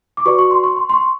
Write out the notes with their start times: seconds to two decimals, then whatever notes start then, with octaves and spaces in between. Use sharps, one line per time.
0.17 D6
0.26 F#4 B4 D5 C#6
0.39 C#6
0.51 C6
0.64 C#6
0.77 C6
0.90 C6
0.94 C#6